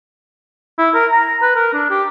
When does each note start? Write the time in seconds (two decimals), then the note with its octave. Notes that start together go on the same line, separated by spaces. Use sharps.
0.78 E4
0.94 A#4
1.11 A#5
1.42 B4
1.55 A#4
1.73 D4
1.90 G4